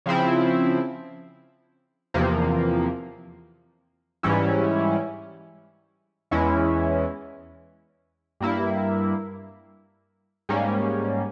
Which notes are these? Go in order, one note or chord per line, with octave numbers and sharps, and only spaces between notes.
C#3 F3 C4 E4
E2 C3 F3 A#3
G#2 E3 G3 C#4 E4
E2 E3 G#3 C#4 E4
G2 G3 A#3 E4
G#2 G3 A#3 C#4